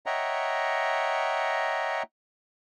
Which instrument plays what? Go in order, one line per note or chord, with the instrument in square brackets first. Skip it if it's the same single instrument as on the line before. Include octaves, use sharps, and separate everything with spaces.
[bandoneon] C#5 D#5 E5 F#5 G5 A#5